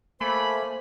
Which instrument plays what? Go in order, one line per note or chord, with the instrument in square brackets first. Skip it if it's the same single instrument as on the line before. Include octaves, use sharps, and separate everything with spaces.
[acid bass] A3 [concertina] A#3 G#5 [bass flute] C5 [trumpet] B5